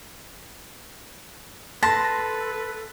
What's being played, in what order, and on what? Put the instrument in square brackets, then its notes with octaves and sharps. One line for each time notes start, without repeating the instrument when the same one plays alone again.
[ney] A4 [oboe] B4 [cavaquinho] A5 [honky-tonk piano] C6 A#6